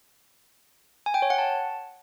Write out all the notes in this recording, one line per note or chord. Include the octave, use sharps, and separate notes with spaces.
G#5
G5
C#5
F#5
A5